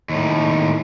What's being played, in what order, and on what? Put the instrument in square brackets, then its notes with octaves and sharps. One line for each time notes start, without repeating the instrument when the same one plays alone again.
[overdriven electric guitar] D#2 A2